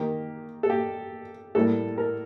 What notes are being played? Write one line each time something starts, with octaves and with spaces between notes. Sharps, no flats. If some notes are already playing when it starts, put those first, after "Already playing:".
Already playing: D#3 A#3 G4
A4
G4
A2 G3 A#3 A4
A#4